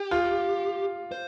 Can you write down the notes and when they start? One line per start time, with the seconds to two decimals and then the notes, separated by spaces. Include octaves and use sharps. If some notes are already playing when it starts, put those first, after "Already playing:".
Already playing: G4
0.11 F4
1.12 C5